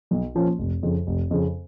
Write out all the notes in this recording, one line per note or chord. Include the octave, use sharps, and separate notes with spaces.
B1
A#2 F3 A#3 C#4
F1
F2 C#3
F1
F2 C#3